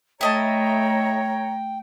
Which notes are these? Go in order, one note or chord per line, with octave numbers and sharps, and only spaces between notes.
A2 A3 E4 C#5 D#5 G5 A5 A#5